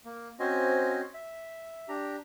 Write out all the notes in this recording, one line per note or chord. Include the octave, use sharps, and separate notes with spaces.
A#3
C4 C#4 F#4 C5 D#5 G#5
E5
D4 G4 A#5